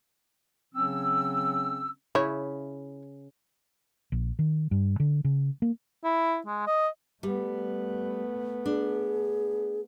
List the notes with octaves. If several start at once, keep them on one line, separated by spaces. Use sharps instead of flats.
C#3 F#3 C4 C#4 E6
C#3 E4 C#5
A#1
D#3
G2
D3
C#3
A#3
E4
G#3
D#5
G3 A3 B3
D4 G#4